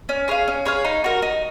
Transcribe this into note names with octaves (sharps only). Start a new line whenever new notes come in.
C#4
G#4 C#5 F5
C#4
G#4 C#5 F5
D#4
F#4 A#4
D#4